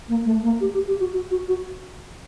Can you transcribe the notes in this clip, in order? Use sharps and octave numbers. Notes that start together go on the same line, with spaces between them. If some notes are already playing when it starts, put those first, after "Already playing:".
A#3
A3
A#3
G4
G4
G4
F#4
F#4
F#4
F#4